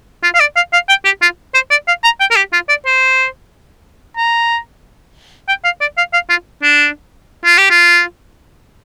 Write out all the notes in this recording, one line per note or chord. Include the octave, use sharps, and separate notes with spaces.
F4
F5
D5
F5
F5
G5
G4
F4
C5
D5
F5
A#5
G5
A#4
G4
F4
D5
C5
A#5
G5
F5
D5
F5
F5
F4
D4
F4
G4
F4